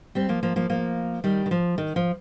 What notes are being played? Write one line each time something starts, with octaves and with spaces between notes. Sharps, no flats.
G3 C4
F3 A#3
F3 A#3
F3 A#3
F3 A#3
D#3 G3
D#3
F3
D#3
F3